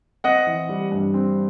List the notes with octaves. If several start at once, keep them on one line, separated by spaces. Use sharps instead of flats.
C4 D#5 F#5
E3
G3
G2
C4